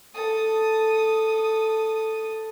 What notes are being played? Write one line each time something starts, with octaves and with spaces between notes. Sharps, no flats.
A4 D#6